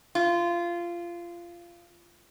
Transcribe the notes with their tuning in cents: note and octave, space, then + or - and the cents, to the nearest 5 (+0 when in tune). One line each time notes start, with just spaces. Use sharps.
F4 -20